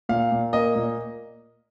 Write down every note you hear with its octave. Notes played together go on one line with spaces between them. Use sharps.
A#2 F5
A#2
A#3 D#5
A#2